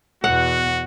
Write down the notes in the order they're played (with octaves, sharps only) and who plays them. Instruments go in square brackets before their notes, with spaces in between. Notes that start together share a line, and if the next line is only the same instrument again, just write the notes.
[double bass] E2 B2 [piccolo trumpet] F#4 [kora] F#5